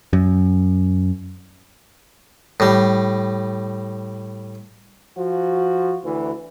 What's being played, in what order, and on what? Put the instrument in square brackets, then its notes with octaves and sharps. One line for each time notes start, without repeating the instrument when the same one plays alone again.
[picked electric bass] F#2
[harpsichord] A2 G3
[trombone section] F3 F#4
D2 E3